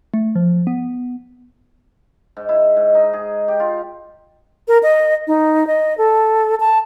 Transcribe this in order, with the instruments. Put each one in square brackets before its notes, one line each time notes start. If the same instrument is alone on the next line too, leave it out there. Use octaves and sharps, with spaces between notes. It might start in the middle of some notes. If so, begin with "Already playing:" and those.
[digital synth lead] A3
F3
B3
[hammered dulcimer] G#2
E4
G#2
D#4
G#4
G4
F4
[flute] A#4
D#5
D#4
D#5
A4
A5